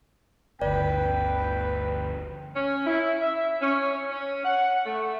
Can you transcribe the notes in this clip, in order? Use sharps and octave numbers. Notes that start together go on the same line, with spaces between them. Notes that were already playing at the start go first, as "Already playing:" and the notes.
G1 D2 B4 D5 G5
C#4
E4
E5
C#4
C#4
F#5
A3